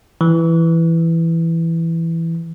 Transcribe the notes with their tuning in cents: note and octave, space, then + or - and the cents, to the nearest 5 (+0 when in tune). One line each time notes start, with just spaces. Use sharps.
E3 +5